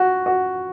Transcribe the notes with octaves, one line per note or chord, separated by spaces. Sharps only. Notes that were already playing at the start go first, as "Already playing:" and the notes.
Already playing: F#4
F#4